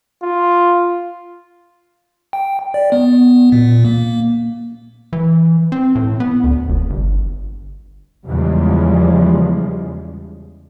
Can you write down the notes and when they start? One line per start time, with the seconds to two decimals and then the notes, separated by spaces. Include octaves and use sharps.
0.23 F4
2.33 G5
2.74 D5
2.92 B3
3.52 A#2
3.85 A#3
5.13 E3
5.72 C4
5.95 A2
6.20 B3
6.44 D2
6.69 F1
6.90 G1
8.26 E2 C#3 F3 G3 G#3